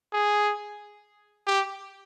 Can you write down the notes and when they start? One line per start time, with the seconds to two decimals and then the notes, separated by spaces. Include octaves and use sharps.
0.13 G#4
1.47 G4